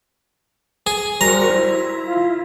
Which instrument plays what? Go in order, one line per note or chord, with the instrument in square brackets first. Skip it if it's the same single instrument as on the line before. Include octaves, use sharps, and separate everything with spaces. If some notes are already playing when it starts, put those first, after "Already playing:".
[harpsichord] G#4
[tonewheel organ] G3 F#4 A#4 [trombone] C5 [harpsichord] A#5
[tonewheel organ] E4
[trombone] F4